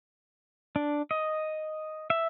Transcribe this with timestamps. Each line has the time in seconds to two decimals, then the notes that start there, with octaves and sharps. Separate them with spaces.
0.76 D4
1.11 D#5
2.10 E5